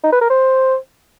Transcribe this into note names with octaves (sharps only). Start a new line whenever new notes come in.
D#4
B4
A#4
C5